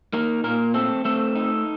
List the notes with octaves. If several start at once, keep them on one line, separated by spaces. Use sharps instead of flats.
A#3 D#4 A#4
A#2 A#3 A#4
A3 C4 A4
A3 C4 A4
D#4